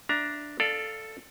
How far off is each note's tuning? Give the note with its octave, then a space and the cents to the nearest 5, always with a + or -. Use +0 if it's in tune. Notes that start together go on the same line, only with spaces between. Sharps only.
D4 +0 E5 +5 A#5 +20
A4 +0 D5 +20 F5 +0